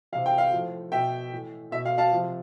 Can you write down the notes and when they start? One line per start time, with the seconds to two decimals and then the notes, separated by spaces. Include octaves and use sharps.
0.12 C3 E3 F5
0.26 G5
0.38 F5
0.52 A2 F3
0.92 B2 E5 G5
1.33 A2 E3
1.71 B2 E5
1.86 F5
1.98 F5 A5
2.12 C3 F3